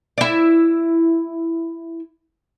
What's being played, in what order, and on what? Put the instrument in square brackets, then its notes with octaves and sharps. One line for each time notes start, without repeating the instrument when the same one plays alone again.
[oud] E4 D5